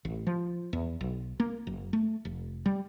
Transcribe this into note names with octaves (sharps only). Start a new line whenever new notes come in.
A1
F3
E2
B1
A#3
F#1
A3
F1
G3